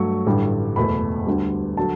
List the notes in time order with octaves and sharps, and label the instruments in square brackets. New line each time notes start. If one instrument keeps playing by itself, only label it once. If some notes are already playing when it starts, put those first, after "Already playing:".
Already playing: [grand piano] G2 F#3 A3 C#6
A1 G2 D3 G3
F#1 E2 B2 A3 B5
D2 D3 G3
D3 F#3 A5